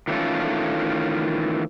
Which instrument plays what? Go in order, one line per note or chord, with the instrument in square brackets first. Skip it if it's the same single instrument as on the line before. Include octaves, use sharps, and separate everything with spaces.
[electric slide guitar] D#3 E3 A3 C#4 F4 A4